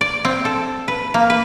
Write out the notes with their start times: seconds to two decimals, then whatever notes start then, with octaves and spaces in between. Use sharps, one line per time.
0.01 D5
0.25 C4
0.45 A4
0.88 B4
1.14 A#3
1.30 B4